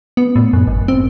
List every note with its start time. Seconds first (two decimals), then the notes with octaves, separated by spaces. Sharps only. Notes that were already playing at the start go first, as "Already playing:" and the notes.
0.17 B3
0.36 A2
0.53 F#2
0.67 G#1
0.88 C4